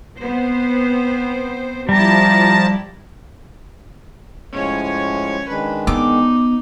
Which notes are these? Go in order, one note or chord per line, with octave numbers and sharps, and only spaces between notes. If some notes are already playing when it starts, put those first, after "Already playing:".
B3 C4 C5
F3 G3 E4 G4 A5 A#5
A2 F3 G#3 C#4 C#5
D#3 G#3 D4 B4
B3 D#4 D6